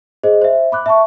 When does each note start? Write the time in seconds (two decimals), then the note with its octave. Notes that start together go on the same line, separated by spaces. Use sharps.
0.23 G#4 C5 D#5
0.41 C5 E5
0.72 B5 D6 F#6
0.86 E5 A5 C#6